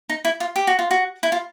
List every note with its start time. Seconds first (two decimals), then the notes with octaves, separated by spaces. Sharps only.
0.09 D#4
0.25 E4
0.40 F4
0.56 G4
0.67 F#4
0.79 F4
0.91 F#4
1.23 E4
1.32 F4